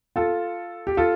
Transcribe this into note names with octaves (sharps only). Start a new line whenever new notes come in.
F4 A4
G4
F4 A4